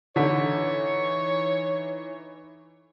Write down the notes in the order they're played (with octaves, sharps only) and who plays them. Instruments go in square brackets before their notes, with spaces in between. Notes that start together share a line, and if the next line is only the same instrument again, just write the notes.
[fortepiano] D3 [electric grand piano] E3 D#4 B6 [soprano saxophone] C#5